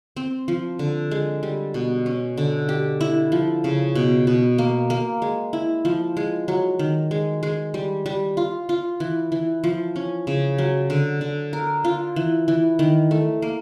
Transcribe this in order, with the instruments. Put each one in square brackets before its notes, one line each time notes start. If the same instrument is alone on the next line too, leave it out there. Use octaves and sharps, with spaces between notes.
[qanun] C4
F3
D3
G#3
G3
B2
C#4
D3
G4
E4
F3
C#3
B2
B2
A#3
A#3
G#3
E4
F3
G#3
F#3
D#3
G#3
G#3
G3
G3
F4
F4
E3
E3
F3
C#4
C#3
F#3
D3
D3
A#4
F4
E3
E3
D#3
A3
A#3